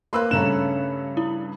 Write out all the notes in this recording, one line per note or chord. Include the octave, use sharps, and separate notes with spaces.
A#3 B4 C5 B5 C6 E6 F#6
G2 C#3 A3 C#4 A4 A#5 F#6 E7
E4